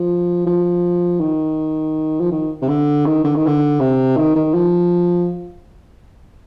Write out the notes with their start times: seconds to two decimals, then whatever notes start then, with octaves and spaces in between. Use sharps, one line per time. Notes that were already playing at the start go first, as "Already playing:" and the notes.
Already playing: F3
0.46 F3
1.20 D#3
2.20 F3
2.31 D#3
2.62 C3
2.68 D3
3.06 D#3
3.24 D3
3.36 D#3
3.46 D3
3.80 C3
4.17 D#3
4.36 D#3
4.54 F3